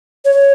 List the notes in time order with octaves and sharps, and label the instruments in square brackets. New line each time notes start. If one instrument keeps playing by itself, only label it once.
[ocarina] C#5